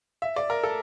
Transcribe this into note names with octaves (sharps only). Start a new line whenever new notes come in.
E5
D5
A#4
A4